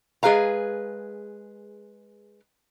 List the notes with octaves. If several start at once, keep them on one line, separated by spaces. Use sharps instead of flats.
G#3 G#4 B4 F5 A#5